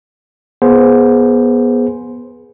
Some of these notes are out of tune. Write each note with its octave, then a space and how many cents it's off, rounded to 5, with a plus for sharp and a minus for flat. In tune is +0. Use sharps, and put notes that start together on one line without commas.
B3 -20 G#4 +5 C5 +0